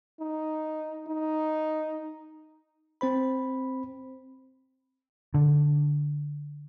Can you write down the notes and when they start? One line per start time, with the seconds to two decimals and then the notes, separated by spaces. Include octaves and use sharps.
0.20 D#4
1.08 D#4
3.01 C4 C5 B5
5.34 D3